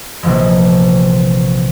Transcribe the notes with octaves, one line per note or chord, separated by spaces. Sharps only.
A#1 C3 E3 F3 G#3